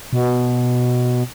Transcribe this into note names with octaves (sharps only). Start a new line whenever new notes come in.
B2